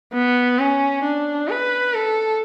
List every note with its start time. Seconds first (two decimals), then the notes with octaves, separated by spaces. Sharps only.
0.14 B3
0.59 C#4
1.04 D4
1.49 B4
1.94 A4